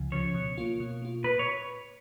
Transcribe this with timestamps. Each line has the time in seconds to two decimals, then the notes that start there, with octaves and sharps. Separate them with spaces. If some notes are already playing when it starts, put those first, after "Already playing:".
Already playing: C#2 C#3 F3
0.12 C#3 F3 C#5
0.34 B2
0.58 A#3 F4
0.80 B2
1.02 A#3 F4
1.24 A#2 B4
1.39 C#5